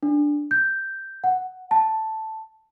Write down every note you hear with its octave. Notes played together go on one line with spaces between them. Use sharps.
D4
G6
F#5
A5